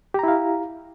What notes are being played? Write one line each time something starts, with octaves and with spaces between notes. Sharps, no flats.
E4 G4 F5 A#5